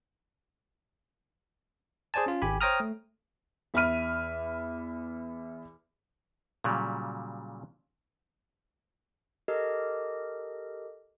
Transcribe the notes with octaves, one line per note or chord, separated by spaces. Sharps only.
G#4 C5 D5 G#5 A5
C#4 F4
G#1 G4 G#5 B5
C5 C#5 G5 A#5 D#6 F6
A3
E2 E5 B5 F6 D#7
A#2 C#3 F#3 G3
G4 A4 A#4 D#5